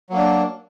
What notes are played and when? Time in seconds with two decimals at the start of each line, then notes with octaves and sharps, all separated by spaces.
0.10 F#3
0.13 A#3
0.16 D4